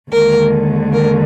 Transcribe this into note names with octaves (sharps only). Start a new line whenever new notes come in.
D#2 D3 G#3 A#4
A#4